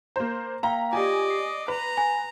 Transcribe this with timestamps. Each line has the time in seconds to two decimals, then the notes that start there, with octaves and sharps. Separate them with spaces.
0.16 A#3 C5 A#5
0.63 A#3 F5 G5 A#5
0.93 F4 G4 D5 D#5 G#5
1.30 C7
1.68 B4 A#5
1.97 G#5